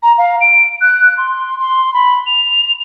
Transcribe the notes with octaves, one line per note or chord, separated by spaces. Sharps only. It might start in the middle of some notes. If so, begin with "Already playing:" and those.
A#5
F5
D7
F#6
C6
C6
B5
F7